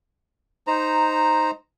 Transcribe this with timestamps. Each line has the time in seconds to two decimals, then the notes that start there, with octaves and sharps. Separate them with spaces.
0.67 D#4 C5 A#5